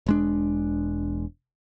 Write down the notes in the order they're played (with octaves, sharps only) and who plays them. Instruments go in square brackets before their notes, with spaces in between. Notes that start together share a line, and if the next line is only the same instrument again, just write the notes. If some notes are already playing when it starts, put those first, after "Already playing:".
[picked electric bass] E1 G#3 D4